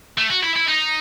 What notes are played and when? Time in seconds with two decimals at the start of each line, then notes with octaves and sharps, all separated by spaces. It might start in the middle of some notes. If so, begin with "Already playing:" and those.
0.18 A3
0.30 F#4
0.43 E4
0.56 E4
0.68 D#4